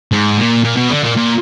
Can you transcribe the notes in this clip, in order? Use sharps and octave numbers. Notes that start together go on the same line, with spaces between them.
G#2
A#2
A#2
B2
D3
A#2
A#2